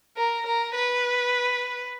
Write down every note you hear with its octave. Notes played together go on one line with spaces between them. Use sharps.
A#4
A#4
B4